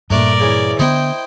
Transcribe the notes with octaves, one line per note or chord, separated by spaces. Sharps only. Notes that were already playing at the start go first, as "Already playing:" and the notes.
G2 A#2 A3 D4 A#4 D5
C#3 E3
D3 B3 E4 C5 D#5 G5